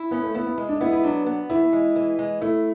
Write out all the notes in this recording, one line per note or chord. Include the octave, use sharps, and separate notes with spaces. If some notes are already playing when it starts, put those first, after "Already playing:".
Already playing: E4
B3 C#4
A3
B3 E4
B3
G#3
D4
B3 E4
E4
F#3 D4
B3
E3 E4
G#3
E3
G#3
A3 E4